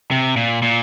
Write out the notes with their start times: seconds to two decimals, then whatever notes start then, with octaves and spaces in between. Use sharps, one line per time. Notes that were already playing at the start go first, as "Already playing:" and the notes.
0.11 C3
0.37 A#2
0.62 A#2